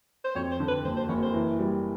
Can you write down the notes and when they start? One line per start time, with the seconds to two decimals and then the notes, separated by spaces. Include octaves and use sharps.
0.24 C5
0.35 F2 C#5
0.51 C5
0.60 D3
0.68 B4
0.84 F#1 C5
0.96 C5
1.09 F#1 C#5
1.22 C5
1.34 E3
1.59 G3